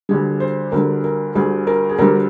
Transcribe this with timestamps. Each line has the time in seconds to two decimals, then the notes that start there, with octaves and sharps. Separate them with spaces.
0.09 D2 D3 G3 G#4
0.40 C5
0.72 D2 D3 G3 A#4
1.04 A#4
1.35 D2 D3 G3 G#4
1.67 A#4
1.89 G#4
1.99 D2 D3 G3 A#4